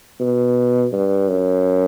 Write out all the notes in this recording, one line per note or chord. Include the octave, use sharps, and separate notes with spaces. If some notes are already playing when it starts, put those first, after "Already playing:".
B2
G2
F#2